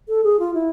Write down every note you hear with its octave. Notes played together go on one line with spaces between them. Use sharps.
A4
G#4
F4
E4